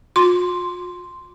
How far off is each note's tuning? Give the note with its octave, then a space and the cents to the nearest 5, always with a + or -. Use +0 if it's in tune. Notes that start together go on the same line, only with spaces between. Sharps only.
F4 +45 C6 +0